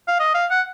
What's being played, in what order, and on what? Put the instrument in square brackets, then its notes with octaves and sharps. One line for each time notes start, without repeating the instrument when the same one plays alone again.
[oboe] F5
D#5
F5
F#5